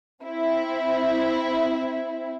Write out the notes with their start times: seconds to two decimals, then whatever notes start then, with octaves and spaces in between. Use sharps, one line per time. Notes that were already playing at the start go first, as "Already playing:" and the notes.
0.23 C4 E4